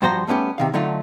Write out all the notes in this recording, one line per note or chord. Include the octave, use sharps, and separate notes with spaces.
G2 F3 F#4 C5 A#5
G3 A3 B3 C#4 G4
C3 D#3 F5
D3 F#3 A3 D#4 F4